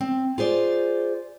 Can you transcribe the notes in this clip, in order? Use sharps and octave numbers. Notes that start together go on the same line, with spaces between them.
C4
F4 G#4 C5 D5